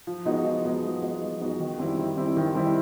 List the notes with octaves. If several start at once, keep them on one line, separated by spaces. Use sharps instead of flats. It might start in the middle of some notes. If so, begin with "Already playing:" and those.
F3
G#3 B3 D#4 F#4
F3
G#3 B3 D#4 F#4
F3
G#3 B3 D#4 F#4
F3
G#3 B3 D#4 F#4
D#3
G3 C4 E4
D#3
G3 C4 E4
D#3
G3 C4 E4